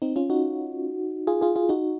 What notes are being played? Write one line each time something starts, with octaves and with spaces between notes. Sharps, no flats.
C4 D#4
C#4 F4
D#4 F#4
F4 G#4
F4 G#4
F4 G#4
D#4 F#4